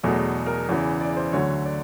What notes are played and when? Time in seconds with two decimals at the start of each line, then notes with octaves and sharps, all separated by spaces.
0.03 E2 B2 F#3 A3 G#4
0.47 A#4
0.69 E2 C#3 E3
1.00 D5
1.17 C5
1.33 D2 D3 F#3 A3 C#5
1.66 D5